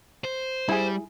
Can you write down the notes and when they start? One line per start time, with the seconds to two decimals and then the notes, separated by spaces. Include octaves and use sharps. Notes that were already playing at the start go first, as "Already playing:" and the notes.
0.24 C5
0.69 G3 E4 G#4